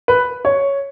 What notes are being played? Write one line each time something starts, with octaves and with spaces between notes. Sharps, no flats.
B4
C#5